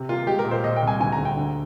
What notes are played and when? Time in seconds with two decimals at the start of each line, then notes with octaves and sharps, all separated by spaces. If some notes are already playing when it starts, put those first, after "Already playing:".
Already playing: C3
0.09 A#3 F4
0.27 G#3 G4
0.39 A#4
0.45 A#2
0.51 C5
0.64 A#2 D#5
0.76 G5
0.82 C2
0.87 G#5
1.00 D2 G#5
1.12 A#5
1.18 D2
1.25 G5
1.37 D3